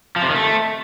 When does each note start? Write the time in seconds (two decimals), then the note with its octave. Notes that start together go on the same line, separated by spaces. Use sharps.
0.16 F3
0.22 C3
0.29 D#3
0.35 A3